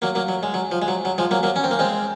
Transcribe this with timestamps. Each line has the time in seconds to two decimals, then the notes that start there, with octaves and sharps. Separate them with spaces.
0.02 F#3 A#3
0.15 F#3 A#3
0.28 F#3
0.43 G#3
0.54 F#3
0.72 F3
0.82 G#3
0.88 F#3
1.05 F#3
1.18 F3 G#3
1.31 F#3 A#3
1.43 F#3 A#3
1.56 C#4
1.64 C4
1.71 A#3
1.79 G#3 C4